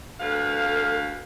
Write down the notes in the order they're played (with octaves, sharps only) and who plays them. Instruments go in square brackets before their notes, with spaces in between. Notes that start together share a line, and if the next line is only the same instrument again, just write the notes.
[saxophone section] D2 B4 F5 [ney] A4